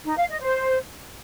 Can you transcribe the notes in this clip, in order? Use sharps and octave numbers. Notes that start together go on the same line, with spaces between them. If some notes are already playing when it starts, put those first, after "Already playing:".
D#4
F5
D#5
C5